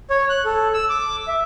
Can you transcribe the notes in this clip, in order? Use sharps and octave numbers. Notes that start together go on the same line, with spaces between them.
C#5
F#6
A4
E6
D6
E5